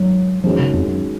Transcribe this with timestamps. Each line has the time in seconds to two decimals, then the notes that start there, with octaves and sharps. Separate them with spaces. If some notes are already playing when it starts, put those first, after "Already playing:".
Already playing: G#2 D#3 F#3
0.44 F#2 D#3 F3 G#3 C#4 F#4
0.59 C#3
0.73 F2
0.87 F#2